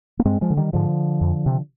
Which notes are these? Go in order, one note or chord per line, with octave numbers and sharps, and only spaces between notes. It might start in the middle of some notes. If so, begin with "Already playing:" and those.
A#3
G2 G#3 C4
F3 G#3
D3
D#3 G3
G#2 D3 F3
F2
C3